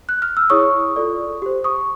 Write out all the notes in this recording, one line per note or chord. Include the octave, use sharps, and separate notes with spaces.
F#6
F6
E6
E4 G#4 C#5 C#6 D#6
F4 A4 D5
G4 C5
C#6 D#6